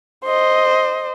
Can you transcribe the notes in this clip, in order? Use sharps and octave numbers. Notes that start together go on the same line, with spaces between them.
C5 D#5